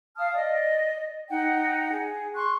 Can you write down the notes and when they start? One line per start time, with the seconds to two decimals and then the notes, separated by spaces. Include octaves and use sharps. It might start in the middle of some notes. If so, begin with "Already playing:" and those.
0.16 F5 A5 D#6 F6
0.34 D5 D#5
1.29 D#4 F#5 G5
1.91 G#4
2.34 C6 C#6 F#6